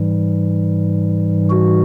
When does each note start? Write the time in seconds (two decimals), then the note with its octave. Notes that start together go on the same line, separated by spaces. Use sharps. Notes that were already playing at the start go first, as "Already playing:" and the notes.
Already playing: G#2 E3 G3
1.50 F#4